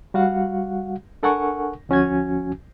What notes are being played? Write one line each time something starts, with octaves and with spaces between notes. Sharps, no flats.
G3 F#4 F5 F#5
D4 A4 A#4 F#5 G#5 C#6
D2 F3 C#4 F#4 G#5 G#6